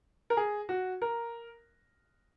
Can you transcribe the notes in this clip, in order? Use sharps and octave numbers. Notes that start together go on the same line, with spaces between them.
A#4
G#4
F#4
A#4